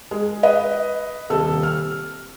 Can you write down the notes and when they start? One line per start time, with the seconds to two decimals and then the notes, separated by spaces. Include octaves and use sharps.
0.11 G#3
0.43 B4 D#5
1.30 D#1 C3 A4 E6
1.63 F6